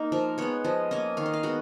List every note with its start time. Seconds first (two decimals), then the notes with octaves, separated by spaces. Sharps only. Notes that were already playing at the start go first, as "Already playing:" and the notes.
Already playing: A#3 D#4
0.12 F3 A#4
0.38 G#3 B3 C#5
0.65 F3 D#5
0.91 A#3 C#4 D#5
1.17 D#3 F5
1.26 D#5
1.34 F5
1.43 G#3 B3 F#4